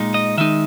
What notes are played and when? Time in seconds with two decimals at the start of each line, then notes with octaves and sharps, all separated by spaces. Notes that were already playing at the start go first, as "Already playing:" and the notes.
Already playing: A#2 G#3 D#4
0.14 D#5
0.38 D#3 G#3 D#4 E5